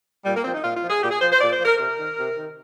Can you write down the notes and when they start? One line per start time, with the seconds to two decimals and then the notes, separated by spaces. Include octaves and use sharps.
0.25 A#2 G3
0.35 A#3
0.44 F3 C4
0.54 D#4
0.63 A#2 F4
0.76 F4
0.82 F3
0.89 G#4
1.01 A#2 G4
1.11 G#4
1.20 F3 C5
1.31 C5
1.40 A#2 D5
1.52 C5
1.58 F3
1.65 A#4
1.78 C3 A#4
1.97 D#3
2.16 C3
2.35 D#3